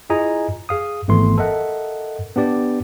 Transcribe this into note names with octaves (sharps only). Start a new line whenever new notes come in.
E4 F4 G#4 D#5 G#5 A#5
G#4 F5 D#6
G#1 E3 A3 B3 C6
A4 A#4 D#5 E5 F#5
B3 D4 G4 D5